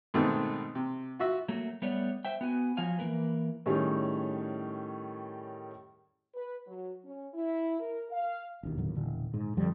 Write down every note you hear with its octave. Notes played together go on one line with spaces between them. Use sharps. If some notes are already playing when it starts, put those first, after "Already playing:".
G#2 B2 D#3 A3 B3 C4
C3
F4 F#4 E5
F#3 A3 A#3
G3 A3 B3 C#5 D5
C5 E5 G5
B3 F#4 G#5
F3 F#3 F5 G#5
E3 A#3 A#4 B4
A2 D#3 G3 C#4 G#4
B4
F#3
C#4
E4
A#4
F5
E1 D#2
A2 D3 F#3
E1 A#2 D3 D#3
G#2
F2 D3 F3 G3